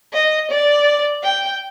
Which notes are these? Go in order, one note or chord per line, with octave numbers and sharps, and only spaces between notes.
D#5
D5
G5